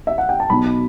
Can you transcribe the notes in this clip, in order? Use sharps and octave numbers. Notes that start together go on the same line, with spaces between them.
E5
F#5
G5
A5
B1 B2 F#3 B5